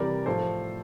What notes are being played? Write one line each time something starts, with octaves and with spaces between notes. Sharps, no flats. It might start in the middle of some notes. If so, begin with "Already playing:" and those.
Already playing: C3 E3 G3 A#4 D5
A2 F3 A3 A4 C5